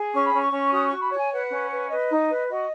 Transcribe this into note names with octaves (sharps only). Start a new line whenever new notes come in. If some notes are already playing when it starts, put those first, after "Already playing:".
Already playing: G#4
C#4 C#6
B5
C#4
C#6
C#4
F#4 D#6
F#4 C#6
B5
C#5
G#5
B4 F#5
C#4
B4
B4 D#5
D#4
B4
F#4 D#5